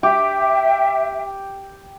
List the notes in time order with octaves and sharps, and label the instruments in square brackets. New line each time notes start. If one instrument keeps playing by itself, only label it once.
[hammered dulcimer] G4 [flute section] E5 G5